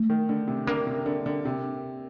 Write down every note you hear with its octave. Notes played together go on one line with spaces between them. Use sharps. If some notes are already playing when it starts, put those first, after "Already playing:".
Already playing: A3
D#3
D3
C3
D3 A#3
C3
D3
D3
C3